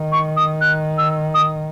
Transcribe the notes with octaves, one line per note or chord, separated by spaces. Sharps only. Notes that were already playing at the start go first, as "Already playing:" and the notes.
Already playing: D#3
C#6
D#6
F#6
E6
D#6